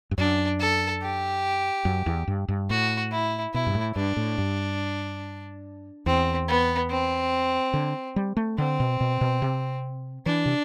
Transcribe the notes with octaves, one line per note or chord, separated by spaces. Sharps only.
G2
F#2 D4
A4
G4
F#2
E2
G2
G2
A2 F#4
E4
B2 E4
G2
A2
G2 D4
A2
G2
E2 C4
B3
C4
D3
G3
A3
D3 C4
B2
B2
B2
C3
E3 D4
C3